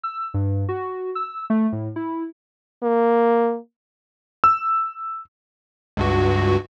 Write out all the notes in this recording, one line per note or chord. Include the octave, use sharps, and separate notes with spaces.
E6
G2
F#4
E6
A3
A2
E4
A#3
E6
C#2 G2 F#4